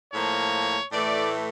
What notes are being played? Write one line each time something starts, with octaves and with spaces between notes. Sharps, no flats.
A2 F3 A#3 C#5
A2 E3 A3 D5